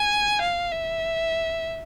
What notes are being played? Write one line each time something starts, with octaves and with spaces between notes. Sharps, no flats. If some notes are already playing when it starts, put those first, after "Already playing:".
Already playing: G#5
F5
E5